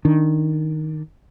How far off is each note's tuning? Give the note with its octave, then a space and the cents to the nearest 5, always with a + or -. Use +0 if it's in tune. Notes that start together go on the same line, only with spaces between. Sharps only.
D#3 +0 D4 +0